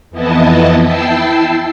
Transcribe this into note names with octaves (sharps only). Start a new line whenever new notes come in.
F2 E3 B3 E4 D#5 A5
E4 G5 A5 E6 C7